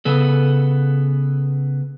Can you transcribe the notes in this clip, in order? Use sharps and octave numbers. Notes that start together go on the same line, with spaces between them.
C#3 B3 A4